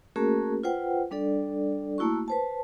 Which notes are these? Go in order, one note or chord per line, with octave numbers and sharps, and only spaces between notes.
A3 A#3 C#4 F#4 G#4 A#4
F4 B4 C5 F#5 G5
G3 D4 A4 D5
A3 A#3 E4 F#4 C#6
B4 C5 A5